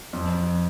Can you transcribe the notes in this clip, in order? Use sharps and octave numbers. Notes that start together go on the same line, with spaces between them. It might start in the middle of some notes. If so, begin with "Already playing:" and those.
F2